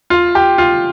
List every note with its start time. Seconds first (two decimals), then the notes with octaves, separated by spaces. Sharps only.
0.10 F4
0.35 G4
0.58 F4